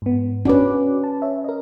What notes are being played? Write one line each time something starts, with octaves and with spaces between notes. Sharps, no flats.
G#2 B3
C#4 D4 F#4 B4 D6
A5
C#5 E5
A#4 D#5